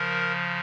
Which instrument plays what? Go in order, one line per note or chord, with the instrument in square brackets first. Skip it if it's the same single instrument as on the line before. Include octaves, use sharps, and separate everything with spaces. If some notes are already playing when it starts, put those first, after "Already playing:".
Already playing: [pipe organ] C#3 F3 A#4